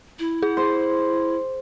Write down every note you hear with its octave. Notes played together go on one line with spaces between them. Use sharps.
E4
G#4
C5